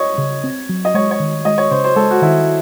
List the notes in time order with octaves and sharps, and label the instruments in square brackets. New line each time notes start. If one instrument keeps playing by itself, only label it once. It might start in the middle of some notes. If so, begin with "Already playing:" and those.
Already playing: [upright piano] C#5 D#5
[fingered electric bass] C#3
C4
F#3
[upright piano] D#5
[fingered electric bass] G#3 [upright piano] C#5
[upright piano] C#5
[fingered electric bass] D#3
[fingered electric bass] G#3 [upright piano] D#5
[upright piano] C#5
[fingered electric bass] C#3 [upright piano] C5
[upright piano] C5
[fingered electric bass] G#3 [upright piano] A4
[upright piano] F#4
[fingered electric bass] D#3 [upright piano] E4